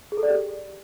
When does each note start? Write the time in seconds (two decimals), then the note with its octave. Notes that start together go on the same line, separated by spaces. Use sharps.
0.12 G#4
0.17 A4
0.23 D5
0.28 G4